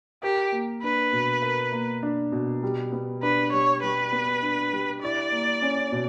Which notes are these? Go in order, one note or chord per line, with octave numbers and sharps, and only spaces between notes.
G4 A#4
A#3
D4 B4
B2
A#4
A#3
D4
B2
G3
B3
D4 B4
G3 C#5
G3 B4
B3
D4
G3
E4 D5
A#3
C#4
B2